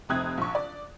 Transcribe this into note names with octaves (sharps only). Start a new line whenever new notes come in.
F1 C3 C4 D#6 F#6 G#6
A#1 C#6
D5